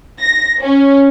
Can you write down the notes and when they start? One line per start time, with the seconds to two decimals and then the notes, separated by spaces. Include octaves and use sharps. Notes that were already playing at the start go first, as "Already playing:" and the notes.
0.20 A#6
0.60 C#4